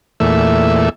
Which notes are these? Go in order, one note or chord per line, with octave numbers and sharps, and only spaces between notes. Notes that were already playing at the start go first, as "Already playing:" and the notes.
E2 A#2 A3 E5